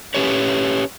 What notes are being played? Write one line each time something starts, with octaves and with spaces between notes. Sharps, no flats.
C#4 G4 B4 C#5